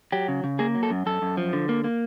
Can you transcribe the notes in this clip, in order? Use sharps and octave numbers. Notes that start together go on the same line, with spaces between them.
F#3 G4
C#3
C#3
A#3 G#4
F#3
A4
F#2
F#2 A4
F#2
F3
D3
A#3
A#3